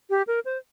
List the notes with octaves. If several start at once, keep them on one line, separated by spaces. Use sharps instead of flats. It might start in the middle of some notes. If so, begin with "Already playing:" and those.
G4
A#4
C5